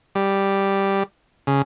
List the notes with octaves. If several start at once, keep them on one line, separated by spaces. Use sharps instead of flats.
G3
C#3